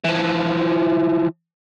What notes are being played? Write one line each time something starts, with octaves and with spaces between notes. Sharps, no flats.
E3 F3